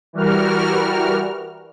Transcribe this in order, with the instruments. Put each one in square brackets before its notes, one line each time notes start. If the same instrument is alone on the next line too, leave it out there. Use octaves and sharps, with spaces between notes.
[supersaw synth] E3 G3 F#4 A#4 F6